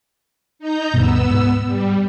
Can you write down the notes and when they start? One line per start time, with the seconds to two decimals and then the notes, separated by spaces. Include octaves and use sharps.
0.59 D#4 A#5 G6
0.94 D2 G2 B2 B3 E6
1.31 G#2
1.66 G3